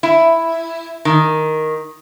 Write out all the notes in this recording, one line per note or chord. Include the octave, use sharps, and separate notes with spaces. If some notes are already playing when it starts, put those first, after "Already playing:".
E4
D#3